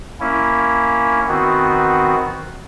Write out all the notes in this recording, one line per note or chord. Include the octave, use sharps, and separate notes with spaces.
A#3 C#4 E4
D#3 B3 C4 F#4